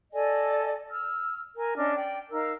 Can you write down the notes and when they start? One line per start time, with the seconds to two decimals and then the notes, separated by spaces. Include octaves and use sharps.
0.12 A4 D5 D#5 G#5
0.90 E6 F6
1.57 A#4 G#5
1.76 C#4 D4 D#5 F6
1.96 D5 G5
2.31 D#4 A#4 F5 E6